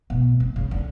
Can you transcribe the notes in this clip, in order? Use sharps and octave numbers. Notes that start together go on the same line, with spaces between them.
B2
C3
C#3
D3